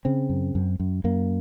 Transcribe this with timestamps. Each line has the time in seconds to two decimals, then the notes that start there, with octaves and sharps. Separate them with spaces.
0.05 C#3 C4
0.30 F#2
0.55 F#2
0.80 F#2
1.04 F#2 A#3